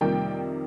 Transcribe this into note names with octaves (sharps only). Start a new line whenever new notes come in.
F2 C3 D#3 G3 A#3 G5